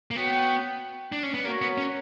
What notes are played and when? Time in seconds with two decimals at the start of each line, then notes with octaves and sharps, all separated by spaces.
0.11 A#3
0.16 B3 F#4 C#5 G5
1.12 D4
1.23 C#4
1.34 B3
1.45 A#3 F#4 A#4 C#5
1.62 B3
1.78 C#4